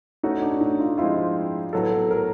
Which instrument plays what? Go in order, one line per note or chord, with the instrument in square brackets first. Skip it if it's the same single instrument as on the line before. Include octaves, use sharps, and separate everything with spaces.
[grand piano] A3 C#4 F#4 [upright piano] D#4
[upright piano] D4
D#4
F4
[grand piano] F3 G#3 C4 E4 G4 [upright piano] F4
[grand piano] A2 F#3 B3 [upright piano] A4
[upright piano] A#4